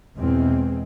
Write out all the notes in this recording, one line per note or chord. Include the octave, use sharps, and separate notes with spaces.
E2 B2 G#3 C4